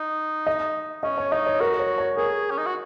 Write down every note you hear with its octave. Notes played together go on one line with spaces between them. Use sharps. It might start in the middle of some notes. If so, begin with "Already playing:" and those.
Already playing: D#4
D#5
C#4 D#5
C#5
D#4 D#5
C#5
F#4 A#4
C#5
C#5
G#4 A#4
C#4
D#4
F#4